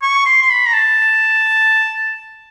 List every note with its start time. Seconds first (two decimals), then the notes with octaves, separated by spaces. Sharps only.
0.02 C#6
0.26 C6
0.42 C6
0.51 B5
0.67 A#5
0.73 A5